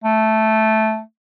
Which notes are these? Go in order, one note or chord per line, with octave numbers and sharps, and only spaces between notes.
A3